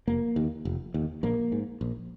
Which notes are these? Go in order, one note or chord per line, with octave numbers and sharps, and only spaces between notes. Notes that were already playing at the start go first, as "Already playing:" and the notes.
F1 A#3
D#2
F1
D#2
A#1 A#3
G#2
A#1